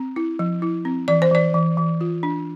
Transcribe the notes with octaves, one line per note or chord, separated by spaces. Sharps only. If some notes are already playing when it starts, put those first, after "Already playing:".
Already playing: C4
E4
F3
E4
C4
E3 D5
C5
E3 D5
E3
E3
F4
D4